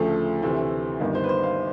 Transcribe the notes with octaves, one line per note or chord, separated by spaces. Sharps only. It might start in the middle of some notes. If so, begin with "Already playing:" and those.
Already playing: D2 C#3 F3 A3 A4
D2 C3 E3 A3 C4
G1 G2 D#3
C5
B4
C5
F5